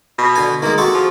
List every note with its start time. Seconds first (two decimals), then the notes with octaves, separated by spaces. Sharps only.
0.18 B2
0.35 D3 G#5
0.62 D#3 G#3 A#3
0.78 C3 F#4 G#4 A4
0.94 F3